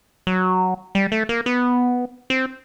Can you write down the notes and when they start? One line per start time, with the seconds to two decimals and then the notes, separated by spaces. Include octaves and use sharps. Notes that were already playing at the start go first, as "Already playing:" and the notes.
0.27 F#3
0.95 G3
1.12 A3
1.29 A#3
1.46 B3
2.30 C4